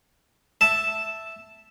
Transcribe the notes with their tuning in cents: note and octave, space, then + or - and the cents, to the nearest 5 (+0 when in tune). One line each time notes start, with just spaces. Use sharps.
E5 +0 A5 +0